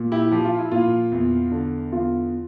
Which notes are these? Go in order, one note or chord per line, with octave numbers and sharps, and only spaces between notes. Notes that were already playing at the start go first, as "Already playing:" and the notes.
Already playing: A#2
E4 G4
F3 G4
F4
E4
A#2 F4
E2
D3
E2 F4